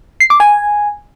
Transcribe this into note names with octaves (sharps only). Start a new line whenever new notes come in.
C7
D6
G#5